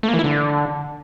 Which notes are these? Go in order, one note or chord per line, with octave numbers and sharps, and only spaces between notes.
A3
A#3
E3
E4
D3